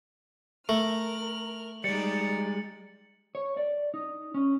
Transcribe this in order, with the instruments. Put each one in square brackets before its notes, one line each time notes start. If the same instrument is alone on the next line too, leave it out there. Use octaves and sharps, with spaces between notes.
[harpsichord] A3 [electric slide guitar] A#4 [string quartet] F6 [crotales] F#7
[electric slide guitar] G3 G#3 [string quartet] D#4 D5 [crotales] A6 C#7
[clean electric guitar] C#5
D5
D#4
C#4